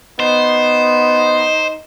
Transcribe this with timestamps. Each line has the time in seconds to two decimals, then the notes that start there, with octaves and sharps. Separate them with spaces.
0.20 B3 D#4 C5